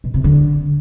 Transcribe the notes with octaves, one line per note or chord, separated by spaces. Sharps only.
B2
C3
D3